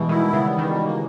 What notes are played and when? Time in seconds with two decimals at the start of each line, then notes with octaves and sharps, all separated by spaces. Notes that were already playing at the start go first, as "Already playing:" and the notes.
Already playing: B2 E3 G3 G#3
0.09 D#3 E4
0.28 B3
0.33 C#3
0.46 G3
0.58 D#3
0.64 B2
0.83 A#3